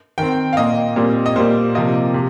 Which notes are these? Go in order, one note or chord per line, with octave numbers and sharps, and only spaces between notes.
D#3 C4 G5
F5
A#2 A#3 D#5
A#2 G3 C4
D#5
A#2 G3 A#3 C5
C3 F3 A#3 D#5
C3